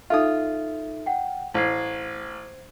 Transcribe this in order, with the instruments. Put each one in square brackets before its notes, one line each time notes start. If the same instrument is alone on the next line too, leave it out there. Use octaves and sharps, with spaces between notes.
[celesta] D#4 A4 E5 [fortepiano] F4 D#6
[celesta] F#5 G5
[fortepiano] A1 [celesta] C5 G#6 C7